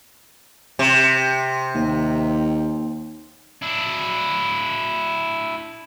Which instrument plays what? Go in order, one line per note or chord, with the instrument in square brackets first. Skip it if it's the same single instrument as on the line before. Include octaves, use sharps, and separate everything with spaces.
[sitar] C3
[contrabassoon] D#2
[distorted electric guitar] D4 E4